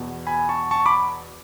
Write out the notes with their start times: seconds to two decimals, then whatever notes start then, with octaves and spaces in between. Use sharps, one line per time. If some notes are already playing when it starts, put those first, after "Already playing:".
Already playing: E2 B2
0.27 G#5 B5
0.49 A5 C#6
0.71 A5 C#6
0.86 B5 D6